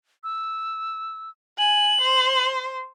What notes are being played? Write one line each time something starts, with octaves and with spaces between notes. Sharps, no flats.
E6
G#5 F#7
C5